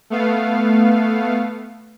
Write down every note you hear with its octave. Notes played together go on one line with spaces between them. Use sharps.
A3 B3 F5